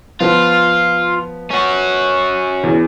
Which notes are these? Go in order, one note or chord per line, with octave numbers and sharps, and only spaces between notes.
F3 B3 F4
C#4 F#4
E2